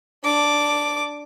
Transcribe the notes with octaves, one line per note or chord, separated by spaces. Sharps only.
D4 D6